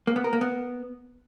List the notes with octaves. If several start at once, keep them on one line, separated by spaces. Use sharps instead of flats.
A#3
B3
A#4
A#3
B3